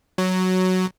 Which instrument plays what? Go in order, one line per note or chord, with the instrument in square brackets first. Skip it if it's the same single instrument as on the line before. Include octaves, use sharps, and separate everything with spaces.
[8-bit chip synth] F#3